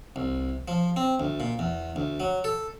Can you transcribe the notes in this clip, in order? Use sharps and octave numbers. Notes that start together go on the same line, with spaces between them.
C2
F3
C4
D2
A#2
E2
D2
F#3
A4